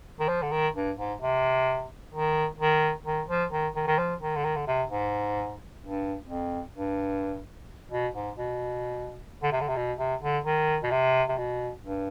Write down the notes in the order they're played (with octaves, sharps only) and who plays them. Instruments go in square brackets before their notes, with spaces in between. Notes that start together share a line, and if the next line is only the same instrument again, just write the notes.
[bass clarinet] D#3
F3
D3
D#3
G2
G#2
C3
D#3
D#3
D#3
F3
D#3
D#3
D#3
F3
D#3
D3
D#3
D3
C3
G#2
G2
F2
G2
B2
G#2
B2
D3
C3
D3
C3
B2
C3
D3
D#3
B2
C3
C3
B2
G2